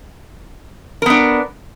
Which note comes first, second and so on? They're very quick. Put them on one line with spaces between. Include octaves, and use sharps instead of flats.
A#4 B3 D4